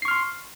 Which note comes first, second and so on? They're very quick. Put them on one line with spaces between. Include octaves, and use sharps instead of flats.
C7 C#6 F6 C6